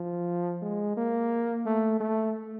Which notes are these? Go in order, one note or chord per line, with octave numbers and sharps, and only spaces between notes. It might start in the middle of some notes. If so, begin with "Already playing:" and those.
Already playing: F3
G#3
A#3
A3
A3